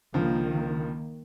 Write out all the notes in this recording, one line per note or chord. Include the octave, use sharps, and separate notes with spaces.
C#2 D3 D#3 F3 A#3